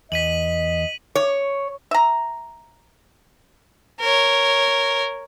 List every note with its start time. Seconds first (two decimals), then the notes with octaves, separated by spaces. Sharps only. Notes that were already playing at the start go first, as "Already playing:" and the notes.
0.12 E2 D#5 B6 D#7 F#7
1.15 C#5
1.91 E5 A#5
4.00 A#4 C#5